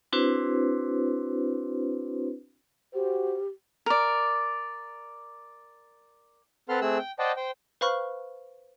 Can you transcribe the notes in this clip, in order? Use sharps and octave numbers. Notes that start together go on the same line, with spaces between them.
C4 D4 E4 F#4 B4 C5
F#4 G4 C5
A#4 D5
C4 A4 B4 F#5 C6 F6
A3 C4 G#4 E6 F#6
G5
C5 D5 D#5 F#5 G5 A5
C5 G5
B4 C5 F5 B5 C#6 F6